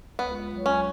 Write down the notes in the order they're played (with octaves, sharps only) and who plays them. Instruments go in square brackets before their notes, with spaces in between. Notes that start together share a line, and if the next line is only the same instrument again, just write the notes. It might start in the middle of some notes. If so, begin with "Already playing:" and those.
[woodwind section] C#2 [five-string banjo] B3
[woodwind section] F#3
[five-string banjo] C#4